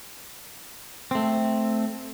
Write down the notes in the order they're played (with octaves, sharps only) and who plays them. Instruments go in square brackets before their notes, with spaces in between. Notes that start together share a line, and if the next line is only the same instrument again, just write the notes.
[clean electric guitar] A3 C4